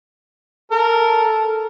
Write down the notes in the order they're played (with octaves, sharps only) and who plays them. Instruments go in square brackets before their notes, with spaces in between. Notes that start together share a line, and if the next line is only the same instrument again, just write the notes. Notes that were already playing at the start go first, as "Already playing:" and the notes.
[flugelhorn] A4 [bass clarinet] A#4